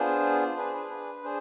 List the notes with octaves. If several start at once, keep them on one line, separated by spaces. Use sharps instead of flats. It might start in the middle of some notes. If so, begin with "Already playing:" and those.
Already playing: B3 D4 F4 G#4 C5
D4 G#4 B4
B4
B4
D4 G#4 C5